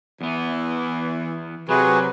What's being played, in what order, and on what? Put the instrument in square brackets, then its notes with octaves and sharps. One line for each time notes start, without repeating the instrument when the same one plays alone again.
[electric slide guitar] E2 B3 [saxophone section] E3
[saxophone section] C3 [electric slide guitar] F#3 [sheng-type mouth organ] F#4 G#4 B4